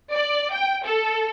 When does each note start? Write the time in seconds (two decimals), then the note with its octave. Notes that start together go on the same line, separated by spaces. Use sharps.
0.11 D5
0.52 G5
0.85 A4